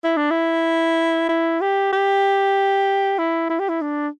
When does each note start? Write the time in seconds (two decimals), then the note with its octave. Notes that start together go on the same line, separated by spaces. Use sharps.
0.04 E4
0.17 D4
0.31 E4
1.29 E4
1.61 G4
1.93 G4
3.19 E4
3.50 E4
3.60 G4
3.69 E4
3.81 D4